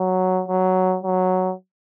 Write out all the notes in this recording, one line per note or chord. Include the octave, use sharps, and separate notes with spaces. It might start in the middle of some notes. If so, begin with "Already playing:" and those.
Already playing: F#3
F#3
F#3